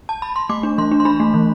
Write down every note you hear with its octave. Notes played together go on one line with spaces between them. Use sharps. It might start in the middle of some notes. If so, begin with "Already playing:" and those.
A5
B5
C6
A3 D6
D4
E3 C6
D4
C6
D4 B5
A3
E3